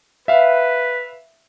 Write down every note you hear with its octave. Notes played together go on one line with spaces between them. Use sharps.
B4 E5 F5